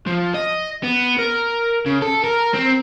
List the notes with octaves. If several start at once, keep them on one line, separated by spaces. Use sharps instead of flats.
F3
D#5
B3
A#4
C#3
A4
A#4
C4